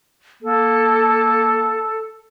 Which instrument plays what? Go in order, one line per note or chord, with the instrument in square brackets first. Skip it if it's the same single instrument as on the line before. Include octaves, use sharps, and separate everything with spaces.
[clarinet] A#3 [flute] A4